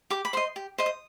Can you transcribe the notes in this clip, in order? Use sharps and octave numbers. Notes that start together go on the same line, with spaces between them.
G4 D6
B5
C5 D#5 C6
G4
C5 D#5
D#6